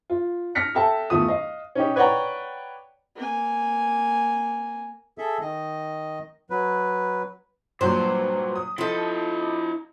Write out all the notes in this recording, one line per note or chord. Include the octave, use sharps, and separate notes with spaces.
F4
F6 A#6 B6 C#7
G4 A4 E5 G5 A5
E2 D#3 A3 F4 D#6
D#5 F5
C#4 D#4 G4
B4 C#5 D5 F#5 G5 A#5
A#3 G#5
G#4 A4 E5
D#3 D#5
F#3 B4
G2 A#2 F#3 C5
D#6
F3 E4 A4 D#5